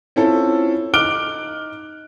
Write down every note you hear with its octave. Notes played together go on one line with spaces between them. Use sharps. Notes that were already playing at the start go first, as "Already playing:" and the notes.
C4 C#4 E4 F4 A4
D#4 D6 F6 F#6 D7 G7